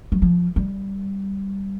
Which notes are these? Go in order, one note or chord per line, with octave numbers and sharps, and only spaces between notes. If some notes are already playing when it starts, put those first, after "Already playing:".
F#3
F3
G3